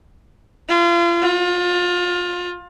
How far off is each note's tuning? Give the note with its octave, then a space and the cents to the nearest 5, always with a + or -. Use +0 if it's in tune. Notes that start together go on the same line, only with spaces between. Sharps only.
F4 -35
F4 +25